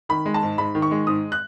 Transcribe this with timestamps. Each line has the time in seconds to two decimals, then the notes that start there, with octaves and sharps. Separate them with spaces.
0.09 D#3 B5
0.25 G#3
0.34 A5
0.43 G#2
0.58 G#2 B5
0.75 D#3
0.82 C#6
0.91 G#3
1.07 G#2 D#6
1.32 F#6